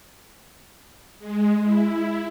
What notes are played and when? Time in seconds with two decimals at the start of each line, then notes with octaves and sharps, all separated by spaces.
1.19 G#3
1.62 E4